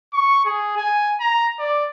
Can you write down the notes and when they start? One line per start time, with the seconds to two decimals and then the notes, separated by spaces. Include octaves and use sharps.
0.14 C#6
0.45 G#4
0.77 G#5
1.20 A#5
1.59 D5